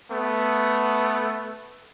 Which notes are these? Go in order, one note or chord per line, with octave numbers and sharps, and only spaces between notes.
A3 B3